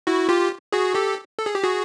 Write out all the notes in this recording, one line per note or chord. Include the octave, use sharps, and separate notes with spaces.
E4 F#4
F4 G4
F#4 G#4
G4 A4
A4
G#4
G4
F#4 G#4